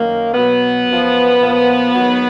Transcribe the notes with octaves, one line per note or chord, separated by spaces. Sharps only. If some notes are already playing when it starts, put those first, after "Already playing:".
Already playing: F#2 D#3 F#3 A#3
B2 F#3 B3
F#2 F3
A#2 F3
G#2 D#3 F#3